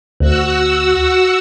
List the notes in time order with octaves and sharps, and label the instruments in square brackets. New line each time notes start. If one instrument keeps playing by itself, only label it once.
[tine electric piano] D2 [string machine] F#4 F#5 E6